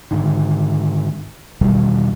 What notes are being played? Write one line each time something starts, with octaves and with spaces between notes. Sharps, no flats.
G#2 D3 D#3
E2 B2 D#3 G3